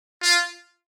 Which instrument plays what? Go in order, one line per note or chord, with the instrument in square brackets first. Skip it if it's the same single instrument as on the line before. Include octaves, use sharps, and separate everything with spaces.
[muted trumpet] F4